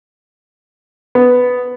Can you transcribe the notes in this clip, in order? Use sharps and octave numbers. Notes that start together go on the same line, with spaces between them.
B3